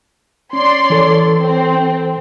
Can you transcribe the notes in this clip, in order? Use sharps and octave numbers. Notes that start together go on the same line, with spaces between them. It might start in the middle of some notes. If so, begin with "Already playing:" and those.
C#4 C#5 D5 C6
E3 A4
C4